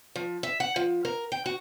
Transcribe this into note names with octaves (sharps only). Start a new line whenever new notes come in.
F3
E5
F#5
F3
A#4
G5
F#4